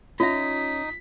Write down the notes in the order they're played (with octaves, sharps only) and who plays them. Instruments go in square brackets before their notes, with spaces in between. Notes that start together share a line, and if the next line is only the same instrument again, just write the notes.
[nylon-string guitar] C#4 [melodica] D#4 D#6 [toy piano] F4 E5 [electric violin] B6